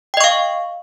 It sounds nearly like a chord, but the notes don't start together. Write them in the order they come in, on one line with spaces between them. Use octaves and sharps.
G5 D#5 C#6 F5